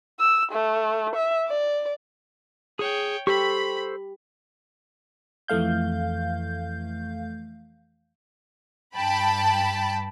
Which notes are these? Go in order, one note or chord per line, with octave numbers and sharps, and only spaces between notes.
E6
A3
E5
D5
G#4 C#5 G5
G4 A4 C5 B5 C#6 B6
F2 E3 A3 F5 G6
G2 G5 A5 B5